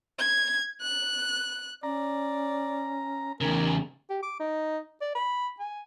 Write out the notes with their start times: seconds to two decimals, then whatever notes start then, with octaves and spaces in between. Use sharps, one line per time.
0.19 G#6
0.82 F#6
1.83 C#4 D5 A#5
3.41 E2 C#3 D#4 A#4
4.09 G4
4.23 D6
4.40 D#4
5.02 D5
5.15 B5
5.59 G#5